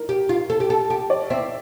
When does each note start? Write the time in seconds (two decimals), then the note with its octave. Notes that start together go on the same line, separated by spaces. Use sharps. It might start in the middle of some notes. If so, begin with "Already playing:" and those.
Already playing: A#4
0.09 G4
0.29 F4
0.50 A4
0.60 G4
0.70 A4
0.90 G4
1.10 D5
1.30 C4 E5